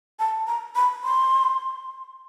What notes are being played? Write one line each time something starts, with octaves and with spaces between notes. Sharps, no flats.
A5
A#5
B5
C6